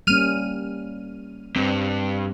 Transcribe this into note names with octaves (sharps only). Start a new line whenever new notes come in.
G3 A#3 C#4 F6 D#7
G2 C4